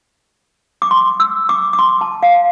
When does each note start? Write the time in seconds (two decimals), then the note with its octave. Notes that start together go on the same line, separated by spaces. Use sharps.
0.82 D6
0.91 C6
1.20 E6
1.49 D6
1.73 D6
1.79 C6
2.01 A5
2.23 F5